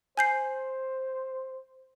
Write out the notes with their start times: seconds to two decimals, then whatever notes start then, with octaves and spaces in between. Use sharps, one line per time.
0.17 C5 G#5 G6 C7